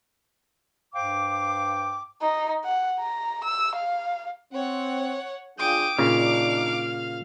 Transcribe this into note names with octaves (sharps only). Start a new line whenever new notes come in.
G2 C5 F5 G5 D6
D#4
F#5
A#5
E6
F5
C4 C#5 F#5
D4 F4 G#4 G5 D6 D#6
A#2 C#3 D4 D#4 F5